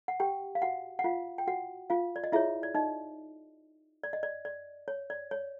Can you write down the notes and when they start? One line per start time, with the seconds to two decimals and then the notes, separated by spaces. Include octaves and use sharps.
0.08 F#5
0.20 G4 G5
0.55 F5
0.62 F#4 F#5
0.99 F#5
1.04 F4 F5
1.38 G5
1.47 F#4 F#5
1.90 F4 F5
2.16 D5
2.24 D#5
2.32 E4 F4 G#4 C#5 E5
2.63 D5
2.75 D#4 D#5
4.03 D5
4.13 D#5
4.23 D5
4.45 D5
4.88 C#5
5.10 D5
5.31 C#5